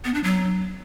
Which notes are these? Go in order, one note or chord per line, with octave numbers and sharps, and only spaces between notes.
B3
D4
F#3